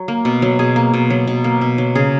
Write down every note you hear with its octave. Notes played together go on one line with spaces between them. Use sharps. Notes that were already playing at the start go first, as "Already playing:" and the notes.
Already playing: F#3
A#3
B2
F#3
B2 G#4
A#3
B2
F#3
B2
A#3
B2
F#3
C#3 G#4